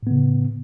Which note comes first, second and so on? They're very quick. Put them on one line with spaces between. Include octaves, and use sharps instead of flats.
A2 B3 C#3